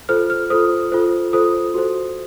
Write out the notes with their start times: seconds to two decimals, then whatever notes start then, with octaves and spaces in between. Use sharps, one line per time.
0.09 F4 A4 C5 F6
0.30 F6
0.50 F4 A4 C5 D#6
0.92 F4 A4 C5
1.33 F4 A4 C5 D#6
1.74 F#4 A4 C5